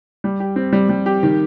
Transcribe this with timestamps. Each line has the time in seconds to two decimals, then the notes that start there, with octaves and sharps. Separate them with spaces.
0.24 G3
0.40 G4
0.56 C4
0.73 G3
0.89 G3
1.06 G4
1.23 D#3